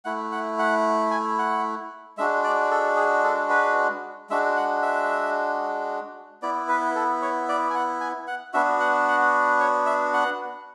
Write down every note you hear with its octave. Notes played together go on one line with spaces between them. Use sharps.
A3 E4 F#5
F#5
F#5
G#5
F#5
G#3 D4 F#4 E5
D5
A4
G#4
A4
B4
G#3 D4 F#4 E5
F#5
E5
B3 E4 D5
B4
A4
C#5
D5
G#5
F#5
G#5
F#5
B3 D4 F#4 E5
F#5
F#5
C#5
E5
F#5